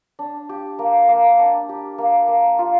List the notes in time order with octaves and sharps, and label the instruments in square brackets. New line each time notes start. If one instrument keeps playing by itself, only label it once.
[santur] D4
G4
A#3
A#3
D4
G4
A#3
A#3
F4